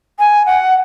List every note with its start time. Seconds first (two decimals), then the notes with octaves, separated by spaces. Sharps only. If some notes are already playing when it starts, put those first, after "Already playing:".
0.19 G#5
0.46 F#5